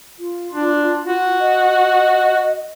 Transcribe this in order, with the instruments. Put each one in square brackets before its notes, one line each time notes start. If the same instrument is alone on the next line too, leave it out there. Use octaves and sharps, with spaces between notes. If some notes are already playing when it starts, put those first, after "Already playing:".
[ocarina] F4
[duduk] D4
F#4
[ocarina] D#5